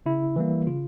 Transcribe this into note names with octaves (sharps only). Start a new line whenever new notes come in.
C#3 E4
E3 G3 A#3
C#3 F4